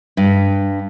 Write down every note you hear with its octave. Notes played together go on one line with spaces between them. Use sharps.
G2